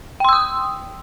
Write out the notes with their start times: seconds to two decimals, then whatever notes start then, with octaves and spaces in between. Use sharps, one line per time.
0.20 G5
0.24 C6
0.29 E6
0.33 D#6